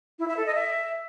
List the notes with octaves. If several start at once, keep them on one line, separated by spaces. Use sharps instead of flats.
E4
E5
A4
D#5
E5